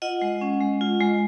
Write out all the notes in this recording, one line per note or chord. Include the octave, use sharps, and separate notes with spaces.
F4 D#5 F#5
G#3
C#4
G#3
F4
G#3